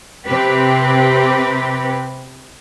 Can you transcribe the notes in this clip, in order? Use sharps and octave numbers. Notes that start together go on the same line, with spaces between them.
C3 C4 G4 B4